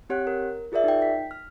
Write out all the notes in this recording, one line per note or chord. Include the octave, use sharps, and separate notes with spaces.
C4 G4 C#5 F#5 F#6
A#4
F4 G#4 A#4 D5 E5
D#4 G5
B6
F6